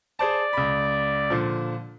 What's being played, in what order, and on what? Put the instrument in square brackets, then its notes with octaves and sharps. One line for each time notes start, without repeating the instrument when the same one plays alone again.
[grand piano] G#4 C5 A5 [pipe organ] D5
[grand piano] C#2 B5
A#2 D3 F3